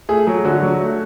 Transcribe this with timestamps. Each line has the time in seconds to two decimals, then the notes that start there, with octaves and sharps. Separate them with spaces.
0.09 A3 G#4
0.27 F#3 G#4
0.45 D3 F#4
0.62 F#3
0.80 A3